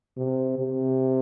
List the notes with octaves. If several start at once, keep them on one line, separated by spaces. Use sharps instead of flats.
C3
C3